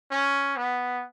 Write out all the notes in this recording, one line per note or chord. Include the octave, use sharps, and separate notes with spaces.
C#4
B3